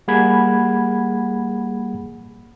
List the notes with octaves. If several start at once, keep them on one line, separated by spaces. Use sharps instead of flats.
G3 A#3 G#4 F#5 B5 G#6